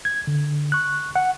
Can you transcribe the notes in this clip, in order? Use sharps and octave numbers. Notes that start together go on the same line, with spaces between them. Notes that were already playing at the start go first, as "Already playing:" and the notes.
G#6
D3
C#6 F#6
F#5